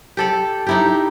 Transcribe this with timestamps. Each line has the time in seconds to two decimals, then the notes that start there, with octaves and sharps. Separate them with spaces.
0.17 G4 A4 D5
0.67 D#4 E4 G4